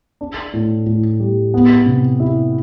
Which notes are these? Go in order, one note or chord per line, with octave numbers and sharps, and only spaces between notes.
D4
A2
A2
G3
B3
C3
E4